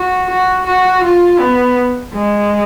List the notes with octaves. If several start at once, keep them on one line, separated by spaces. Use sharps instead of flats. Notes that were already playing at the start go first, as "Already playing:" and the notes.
Already playing: F#4
F#4
F#4
F4
B3
G#3